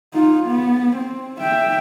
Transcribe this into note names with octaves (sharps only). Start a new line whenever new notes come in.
D#4 F4
B3
C4
E5 G5